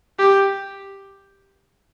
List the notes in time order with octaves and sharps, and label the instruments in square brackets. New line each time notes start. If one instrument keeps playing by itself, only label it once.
[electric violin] G4